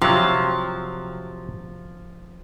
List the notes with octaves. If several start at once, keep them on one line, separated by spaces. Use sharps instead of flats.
C3 F3 F#3